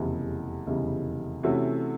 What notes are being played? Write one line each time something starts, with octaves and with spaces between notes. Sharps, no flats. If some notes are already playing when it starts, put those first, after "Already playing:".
Already playing: F1 E2 C#3 E3 G3
F1 E2 C#3 E3 G3
C3 E3 A3 C#4 F#4